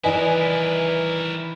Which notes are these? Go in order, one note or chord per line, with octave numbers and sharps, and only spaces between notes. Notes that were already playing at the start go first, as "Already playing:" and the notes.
D#3 E3 E4 A#4 B4 D5 D#5 G#5